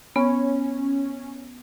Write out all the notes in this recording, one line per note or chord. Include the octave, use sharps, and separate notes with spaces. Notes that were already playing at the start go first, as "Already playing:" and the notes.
B3 C#4